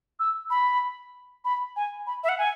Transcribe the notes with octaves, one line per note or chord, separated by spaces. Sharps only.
E6
B5
B5
G#5
B5
E5
F#5
G#5